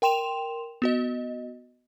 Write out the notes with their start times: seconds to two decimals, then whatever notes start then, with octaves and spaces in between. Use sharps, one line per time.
0.02 A#4 G5 C6 E7 F7
0.82 B3 F#4 D#5